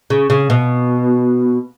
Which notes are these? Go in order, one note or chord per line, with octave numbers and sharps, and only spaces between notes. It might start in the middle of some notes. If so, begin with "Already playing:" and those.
C#3
C#3
B2